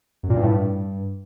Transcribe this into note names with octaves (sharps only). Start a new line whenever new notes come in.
F#2
A#2
G2
A2
G2